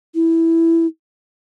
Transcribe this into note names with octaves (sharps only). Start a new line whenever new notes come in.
E4